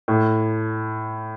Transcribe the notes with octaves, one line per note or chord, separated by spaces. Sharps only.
A2